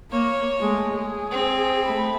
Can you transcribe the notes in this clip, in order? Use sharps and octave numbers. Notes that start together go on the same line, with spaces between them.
A#3 C#5
G#3 A3
G#4
C4
A3 B5